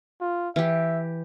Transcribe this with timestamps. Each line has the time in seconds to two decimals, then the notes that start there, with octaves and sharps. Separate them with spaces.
0.21 F4
0.56 E3 G4 E5